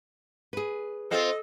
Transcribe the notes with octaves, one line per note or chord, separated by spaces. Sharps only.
G#4 B4
C4 F4 A4 C5 D#5